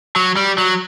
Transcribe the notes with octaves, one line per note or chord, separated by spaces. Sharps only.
F#3
G3
F#3